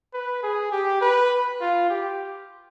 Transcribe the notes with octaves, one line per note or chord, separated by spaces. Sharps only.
B4
G#4
G4
B4
F4
G4